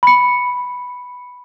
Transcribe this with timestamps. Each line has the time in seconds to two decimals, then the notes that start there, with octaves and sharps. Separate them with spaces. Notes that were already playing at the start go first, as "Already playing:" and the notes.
0.03 B5 C#7